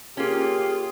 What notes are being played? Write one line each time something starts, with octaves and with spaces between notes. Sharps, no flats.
A#3 C#4 F4 G4 G#4